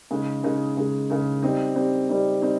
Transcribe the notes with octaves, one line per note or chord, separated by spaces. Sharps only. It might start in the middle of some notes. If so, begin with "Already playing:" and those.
C#3 G#3 D#4
C#3 G#3 D#4
C#3 G#3 D#4
C#3 G#3 D#4
G3 C4 D#4
G3 C4 D#4
G3 C4 D#4
G3 C4 D#4